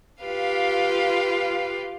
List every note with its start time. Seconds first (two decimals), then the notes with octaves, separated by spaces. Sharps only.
0.22 F4 G4 B4 F5